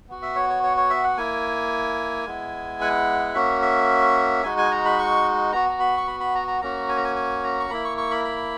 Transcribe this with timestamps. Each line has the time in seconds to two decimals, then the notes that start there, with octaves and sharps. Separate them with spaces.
0.09 B3 F#4
0.22 E5
0.36 C#5
0.49 C#5
0.63 C#5
0.77 C#5
0.90 E5
1.04 F#5
1.17 A#3 E4 G#5
2.27 G#3 B3 E4
2.81 F#5
3.34 A#3 C#4 F#4 E5
3.62 E5
4.43 G#3 D#4 F#4 G#5
4.58 G#5
4.71 A#5
4.85 B5
4.99 C#6
5.53 B3 F#4 A#5
5.69 A#5
5.80 B5
5.97 C#6
6.07 B5
6.20 B5
6.35 A#5
6.48 A#5
6.62 A#3 C#4 F#4 A#5
6.89 G#5
6.97 A#5
7.04 G#5
7.16 G#5
7.44 A#5
7.60 C#6
7.70 A#3 E4 B5
7.85 C#6
7.98 C#6
8.11 B5
8.25 B5